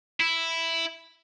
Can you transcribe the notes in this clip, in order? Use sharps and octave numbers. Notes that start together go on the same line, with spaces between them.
E4